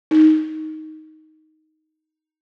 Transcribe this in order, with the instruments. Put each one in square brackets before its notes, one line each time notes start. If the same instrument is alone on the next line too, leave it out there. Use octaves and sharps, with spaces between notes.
[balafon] D#4